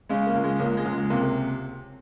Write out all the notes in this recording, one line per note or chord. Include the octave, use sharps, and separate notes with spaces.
C#3 G#3
A#3
C#2
G#3
C#2 A#3
G#3
C#2
G#3
C3 A#3
A#3